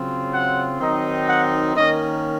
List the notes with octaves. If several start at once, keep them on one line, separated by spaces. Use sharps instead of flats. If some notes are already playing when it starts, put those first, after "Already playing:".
Already playing: C#3 F#3 C4 F4
F#5
D#3 F#3 C4 D#4
F#5
D#3 A#3 C#4 D#5